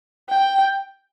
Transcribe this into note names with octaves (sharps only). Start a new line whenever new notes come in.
G5